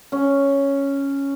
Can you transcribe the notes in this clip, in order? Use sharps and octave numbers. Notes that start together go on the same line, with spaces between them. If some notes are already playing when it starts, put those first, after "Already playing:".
C#4